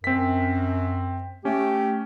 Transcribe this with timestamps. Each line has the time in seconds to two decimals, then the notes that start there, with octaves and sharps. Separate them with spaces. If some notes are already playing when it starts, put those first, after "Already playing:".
0.04 F#2 C4 B6
1.45 A3 C#4 G4